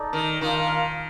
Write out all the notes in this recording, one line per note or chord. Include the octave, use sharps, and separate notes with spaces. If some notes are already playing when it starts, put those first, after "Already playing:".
Already playing: D#4 A4 D5
D#3
D#3 D4 F4 A#4 F5